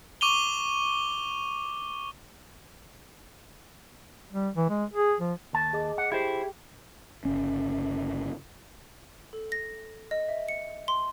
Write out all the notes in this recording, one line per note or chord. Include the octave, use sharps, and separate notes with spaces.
C#6 D6 D#7 F7 G7
G3
E3
G#3
G#4
F3
D#2 A5
G#4 D#5 D6
F#5
E4 G4 G#4 C5 G5
G1 C#3 C#4
A4
A#6
D#5
E5
C#7
C6